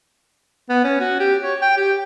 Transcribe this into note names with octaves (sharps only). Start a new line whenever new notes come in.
B3
C#4
F#4
G4
C#5
G5
G4